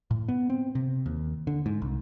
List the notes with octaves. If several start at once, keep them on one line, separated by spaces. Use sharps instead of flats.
A2
B3
C4
C3
D#2
D3
G#2
C2